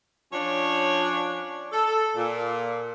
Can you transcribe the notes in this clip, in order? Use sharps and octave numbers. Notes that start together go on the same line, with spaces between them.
F3 C#4 D4 C#5
A4
A#2